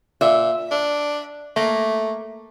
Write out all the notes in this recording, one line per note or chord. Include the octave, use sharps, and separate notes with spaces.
A#2 E5
D4
A3 A#3